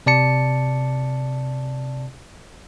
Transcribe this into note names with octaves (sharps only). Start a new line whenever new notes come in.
C3 D5 A5 C#7